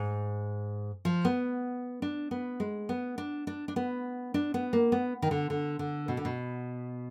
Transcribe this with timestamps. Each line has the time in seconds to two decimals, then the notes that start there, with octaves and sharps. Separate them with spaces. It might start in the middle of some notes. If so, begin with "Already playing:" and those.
Already playing: G#2
1.05 F3
1.25 B3
2.02 D4
2.31 B3
2.60 G#3
2.89 B3
3.18 D4
3.47 D4
3.68 D4
3.76 B3
4.34 D4
4.54 B3
4.73 A#3
4.92 B3
5.22 D#3
5.31 D3
5.50 D3
5.79 D3
6.08 B2
6.17 D3
6.25 B2